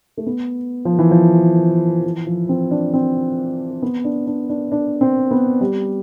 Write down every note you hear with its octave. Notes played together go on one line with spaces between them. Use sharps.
A3
B3
F3
E3
F3
E3
F3
C4
D4
C4
B3
D4
D4
D4
D4
C4
B3
G3